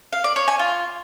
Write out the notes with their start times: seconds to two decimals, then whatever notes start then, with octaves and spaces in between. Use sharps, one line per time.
0.13 F5
0.24 D5
0.36 C#5
0.48 G#5
0.59 F4